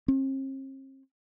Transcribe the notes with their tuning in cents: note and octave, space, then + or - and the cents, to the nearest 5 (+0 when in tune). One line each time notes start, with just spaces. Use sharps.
C4 +45